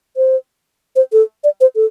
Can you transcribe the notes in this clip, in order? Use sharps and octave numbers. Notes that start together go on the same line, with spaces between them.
C5
C5
A4
D5
C5
A4